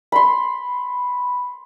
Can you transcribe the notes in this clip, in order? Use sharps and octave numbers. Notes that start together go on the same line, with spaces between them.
B5 C6